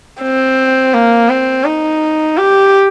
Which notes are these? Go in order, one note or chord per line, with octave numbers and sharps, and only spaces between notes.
C4
A#3
C4
D#4
G4